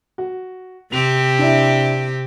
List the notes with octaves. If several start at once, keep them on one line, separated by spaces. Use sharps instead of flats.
F#4
C3 C4 G4 F7
D4 E4